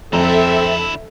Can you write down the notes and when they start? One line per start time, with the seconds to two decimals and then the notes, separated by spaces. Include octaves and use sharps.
0.13 F2 D3 C4 E4 A4 E5 A#5